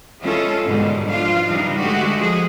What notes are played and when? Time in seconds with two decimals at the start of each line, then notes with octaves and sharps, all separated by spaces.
0.20 E3 G#3 C#4 E4 F4 A4
0.66 G#2 B2 D3 D#3 G3 G#3
1.08 F3 D4 F4 F5
1.47 C#3 E3 G3 D4 D#4
1.80 D3 G#3 A3 F#4 G4
2.17 F3 G#4